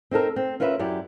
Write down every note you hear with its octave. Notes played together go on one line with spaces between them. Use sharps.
C4 D#4 A4 A#4
C4
C#4 F4 A#4 B4 D5 E5
F#2 E4 G4 D5